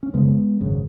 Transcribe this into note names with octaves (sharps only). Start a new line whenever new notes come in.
C#4
F#1 F#2 C#3 G#3 B3
G#1 F#2 C#3